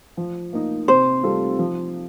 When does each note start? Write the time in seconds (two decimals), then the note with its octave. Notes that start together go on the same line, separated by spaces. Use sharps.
0.17 F3
0.53 A#3 D#4
0.88 C3 C5
1.23 G3 C4 F4 A4
1.59 F3